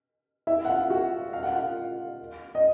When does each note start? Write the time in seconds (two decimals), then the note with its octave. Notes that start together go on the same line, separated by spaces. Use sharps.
0.47 E4 E5
0.65 F#5
0.69 F4 F5
0.90 F#4 F#5
1.33 F5
1.43 F#5
1.52 F4 F5
2.55 D#5